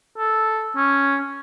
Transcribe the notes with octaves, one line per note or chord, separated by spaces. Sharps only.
A4
C#4